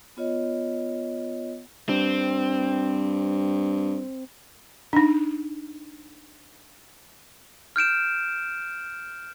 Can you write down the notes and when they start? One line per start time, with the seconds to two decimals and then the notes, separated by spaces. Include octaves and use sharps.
0.17 B3 F4 C#5 D#5
1.89 G2 C4
4.93 D4 D#4
7.76 F6 G6 D7 E7